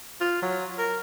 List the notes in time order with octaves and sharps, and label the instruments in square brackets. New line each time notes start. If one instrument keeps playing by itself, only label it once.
[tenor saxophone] F4
F#3
A#4